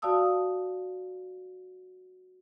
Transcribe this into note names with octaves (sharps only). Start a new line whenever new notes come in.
F#4 D5 F5 A5 D#6 E6